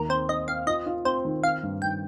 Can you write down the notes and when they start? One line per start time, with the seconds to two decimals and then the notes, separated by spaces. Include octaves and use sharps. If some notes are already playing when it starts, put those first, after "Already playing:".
Already playing: D#2 A#4
0.09 C4 C5
0.29 C4 D#5
0.48 C4 F5
0.67 F4 D#5
0.86 F4
1.05 C4 C5
1.25 D#3
1.43 C4 F5
1.63 G2
1.82 D#3 G5